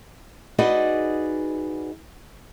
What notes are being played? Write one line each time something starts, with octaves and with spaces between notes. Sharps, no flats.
D#4 F#4 G#4 B4 D5 D#5